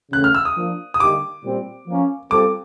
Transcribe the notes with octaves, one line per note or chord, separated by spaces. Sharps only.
C#3 E3 A3 F#6
F6
E6
D#6
F3 A#3 D4
D#6
D3 G3 A#3 D#4 G4 D6
A#2 G3 C4
F3 A#3 C#4
G3 C4 F4 A4 D6